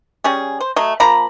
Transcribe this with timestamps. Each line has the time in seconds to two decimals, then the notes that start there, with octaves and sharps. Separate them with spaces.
0.24 G3 C#4 G#4
0.60 C5
0.76 F#3 A3 D#5
1.00 F3 A#3 A#5 B5